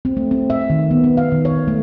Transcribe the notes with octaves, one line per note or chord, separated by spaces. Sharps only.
C4
A3
C4
E5
D#3
B3
B3
F5
D#3
C#5
A3